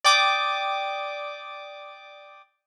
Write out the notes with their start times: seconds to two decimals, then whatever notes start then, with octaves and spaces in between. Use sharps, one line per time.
0.05 D5 G5 D6 D#6